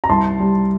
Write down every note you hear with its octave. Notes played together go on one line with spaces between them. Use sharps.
A#5
C2 A5 C6
G3